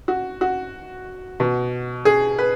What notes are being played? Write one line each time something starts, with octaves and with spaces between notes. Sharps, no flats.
F#4
F#4
B2
G#4
B4